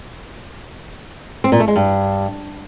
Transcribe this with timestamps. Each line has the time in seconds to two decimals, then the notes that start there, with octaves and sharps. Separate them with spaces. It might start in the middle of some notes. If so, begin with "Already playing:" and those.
1.44 C4
1.52 A#2
1.60 A3
1.68 G#3
1.76 G2